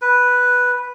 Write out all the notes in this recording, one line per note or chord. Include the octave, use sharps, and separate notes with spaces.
B4